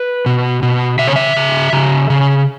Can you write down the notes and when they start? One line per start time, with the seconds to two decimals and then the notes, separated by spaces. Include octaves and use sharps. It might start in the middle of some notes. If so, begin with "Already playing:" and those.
Already playing: B4
0.26 B2
0.63 B2
0.99 C#3 E5
1.07 C#5
1.16 E5
1.37 C#3
1.73 C#3
2.10 C#3